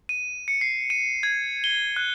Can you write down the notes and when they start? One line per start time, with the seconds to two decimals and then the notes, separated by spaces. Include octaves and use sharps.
0.09 D#7
0.48 C#7
0.61 C7
0.90 D#7
1.23 G#6
1.64 G7
1.96 F#6